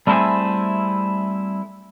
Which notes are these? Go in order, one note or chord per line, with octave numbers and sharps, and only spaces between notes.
G3 A3 C4 E4 G#4 A4